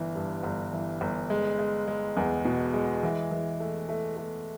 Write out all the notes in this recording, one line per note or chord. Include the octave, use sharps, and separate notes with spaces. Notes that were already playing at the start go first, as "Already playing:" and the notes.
Already playing: G1 E3
G2
G1
E3
G1
G#3
G#3
G#3
E2
B2
G#3
E3
E3
A3
A3
A3